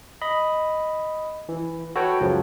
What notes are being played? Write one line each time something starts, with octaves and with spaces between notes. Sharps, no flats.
D#5 B5
E3
F#4 A4 B4 C#5 G5
C#2 F#2 C#3 F3 F#3